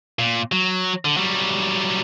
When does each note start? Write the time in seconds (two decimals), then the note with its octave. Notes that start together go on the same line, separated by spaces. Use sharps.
0.19 A#2
0.52 F#3
1.05 D3
1.17 F#3 G3